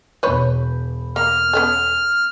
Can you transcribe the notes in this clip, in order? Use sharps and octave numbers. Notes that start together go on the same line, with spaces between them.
E1 B4 C#5 B5 G6
A#3 F6
B3 C#4 A4